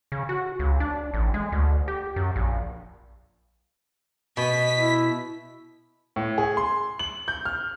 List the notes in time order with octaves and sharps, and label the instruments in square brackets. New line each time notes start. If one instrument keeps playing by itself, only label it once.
[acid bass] C#3
F#4
C#2
D4
A1
G#3
D2
G4
F#2
A#1
[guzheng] B2 [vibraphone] D#5 [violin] B6
[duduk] E4
[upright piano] A2
G#4
C6
F#7
G6
F6